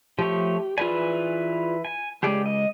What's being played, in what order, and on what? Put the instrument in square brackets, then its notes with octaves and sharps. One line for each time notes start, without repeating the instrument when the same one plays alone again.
[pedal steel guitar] F3 A3 C#5 [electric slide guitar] G4
[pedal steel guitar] E3 B4 G#5 [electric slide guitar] F4 G#4 D5
[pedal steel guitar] G#5
[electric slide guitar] C#3 G#3 [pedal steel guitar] G4 G#4 D5
[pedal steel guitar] D#5